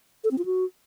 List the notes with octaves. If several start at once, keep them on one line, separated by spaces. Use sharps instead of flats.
A4
C4
F4
F#4